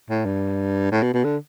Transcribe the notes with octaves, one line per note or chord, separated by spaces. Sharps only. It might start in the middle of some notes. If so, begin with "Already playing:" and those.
A2
G2
A2
B2
B2
D3